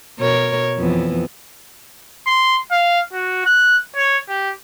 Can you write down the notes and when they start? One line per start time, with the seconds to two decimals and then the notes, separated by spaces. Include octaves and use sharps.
0.19 B2 A#4 C#5
0.78 F2 E3 B3
2.27 C6
2.71 F5
3.13 F#4
3.46 F#6
3.96 C#5
4.29 G4